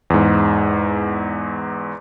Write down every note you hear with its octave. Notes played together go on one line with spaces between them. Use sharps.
E2 G#2